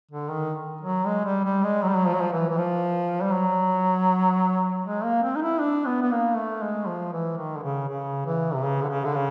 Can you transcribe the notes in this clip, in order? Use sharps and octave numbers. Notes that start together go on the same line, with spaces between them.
D3
D#3
F#3
G#3
G3
G3
G#3
F#3
G3
F#3
F3
F#3
F3
E3
E3
F3
G3
F#3
G#3
A#3
C4
D#4
E4
D4
B3
B3
A#3
A3
G#3
F3
E3
D#3
D3
C#3
C#3
E3
C3
C#3
D3
C#3
D3
C#3